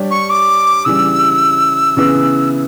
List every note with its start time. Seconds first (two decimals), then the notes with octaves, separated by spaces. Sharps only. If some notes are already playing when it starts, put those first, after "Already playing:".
Already playing: G3 D4 G4 C#5
0.11 C#6
0.30 D6
0.85 C#3 E3 G3 E6
1.97 C#3 E3 B3